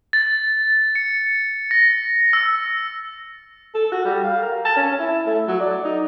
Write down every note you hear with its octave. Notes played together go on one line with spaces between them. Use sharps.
A6
C#7
A#6
E6
A4
F#4
G3
F5
A#4
A5
C#4
E4
A3
F#3
D5
D#4